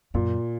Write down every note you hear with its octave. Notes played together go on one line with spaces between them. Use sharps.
F#2 A#2